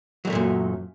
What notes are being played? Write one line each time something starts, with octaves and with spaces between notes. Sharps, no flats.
F#2 A#2 F#3 G3 A3